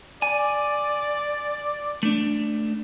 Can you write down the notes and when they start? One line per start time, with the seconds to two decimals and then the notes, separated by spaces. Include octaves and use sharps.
0.22 D5 G#5
2.03 A3 D4